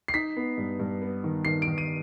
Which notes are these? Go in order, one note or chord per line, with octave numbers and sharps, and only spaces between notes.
C7
D#4 B6
B3
G2
G2
B3
D#3
D#3 C7
D7
D#3
D#7